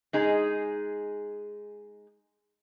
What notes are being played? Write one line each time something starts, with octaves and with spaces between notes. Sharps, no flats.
G#3 D#4 G#4